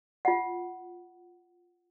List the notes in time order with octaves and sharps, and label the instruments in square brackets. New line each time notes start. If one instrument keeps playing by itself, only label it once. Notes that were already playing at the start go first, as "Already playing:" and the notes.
[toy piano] F4 F#5